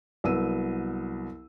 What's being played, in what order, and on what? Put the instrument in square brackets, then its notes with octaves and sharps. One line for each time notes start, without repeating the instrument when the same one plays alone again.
[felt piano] C2 F#3 B3 E6 D#7